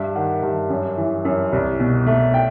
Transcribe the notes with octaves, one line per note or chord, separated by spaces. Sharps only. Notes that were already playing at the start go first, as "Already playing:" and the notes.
Already playing: G2 E5
D#3 F#5
G2
F#2
E3
F#2
C2
B2
A3
G5